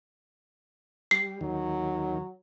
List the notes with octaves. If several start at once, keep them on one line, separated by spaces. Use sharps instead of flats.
G3 C7
D#2 D#3 F#3